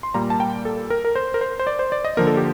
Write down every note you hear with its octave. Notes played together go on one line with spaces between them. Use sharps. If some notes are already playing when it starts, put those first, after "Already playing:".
C6
A#2 G3 A#3 A#5
A5
G5
A4
A#4
A#4
C5
A#4
C5
C5
D5
C5
D5
D#5
D3 F3 A#3 A#4
A4
G4